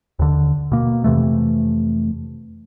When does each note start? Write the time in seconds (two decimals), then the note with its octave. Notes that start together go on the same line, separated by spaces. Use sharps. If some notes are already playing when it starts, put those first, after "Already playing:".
0.19 D#2 D3
0.72 B2 A#3
1.04 F2 C3 E3 A3